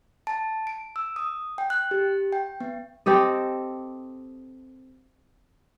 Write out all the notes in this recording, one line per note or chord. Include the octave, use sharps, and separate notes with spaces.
A5
D7
E6
D#6
G5
F#6
G4
G5
B3
C4 G4 A4 D#5